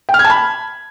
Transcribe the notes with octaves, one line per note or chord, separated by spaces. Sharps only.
G5
F6
G#6
A5
B5